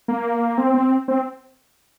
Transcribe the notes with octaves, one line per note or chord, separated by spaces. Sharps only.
A#3
C4
C4
C4